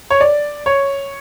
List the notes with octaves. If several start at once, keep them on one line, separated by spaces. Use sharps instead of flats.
C#5
D5
C#5